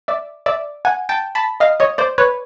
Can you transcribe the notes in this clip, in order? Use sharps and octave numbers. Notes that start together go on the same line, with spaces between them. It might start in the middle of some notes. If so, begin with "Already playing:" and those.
D5 E5
D5 E5
F#5 G#5
G5 A5
A5 B5
D#5 F5
C#5 D#5
C5 D5
B4 C#5